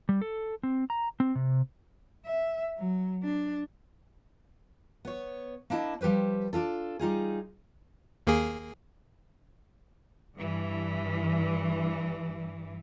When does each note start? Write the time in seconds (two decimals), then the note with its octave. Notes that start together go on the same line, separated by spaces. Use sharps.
0.09 G3
0.22 A4
0.63 C4
0.90 A#5
1.20 C4
1.35 C3
2.25 E5
2.78 F#3
3.23 D4
5.05 B3 C#5
5.70 A#3 D4 E4 D#5 A5
6.01 F3 G3 G4 B4 C5
6.53 D4 D#4 F4 A4
6.99 G3 D#4 F4 G#4
8.27 D#2 A#3 G#4
10.36 G2 E3